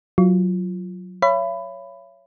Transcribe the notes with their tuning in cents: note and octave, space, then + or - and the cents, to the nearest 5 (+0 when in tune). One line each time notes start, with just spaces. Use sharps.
F#3 -10 F4 -15
C#5 +5 E5 +45 B5 +15